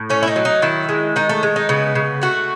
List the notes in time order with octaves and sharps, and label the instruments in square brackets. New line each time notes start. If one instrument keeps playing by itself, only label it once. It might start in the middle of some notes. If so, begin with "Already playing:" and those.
Already playing: [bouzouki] A2
A3 C#4
E4
D#4
F#3
D#4
D#3 E4
G#3
D#3 D#4
A3
G#3
D#4
C#3 B3
C#3
A3 F#4